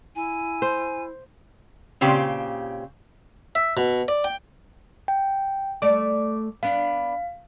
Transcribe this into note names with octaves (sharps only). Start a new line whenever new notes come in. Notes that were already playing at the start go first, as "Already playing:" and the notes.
E4 G#5
C5
A#2 C#3 C4 G4
E5
B2
D5
G5
G5
A3 D5 D6
B3 D4 F5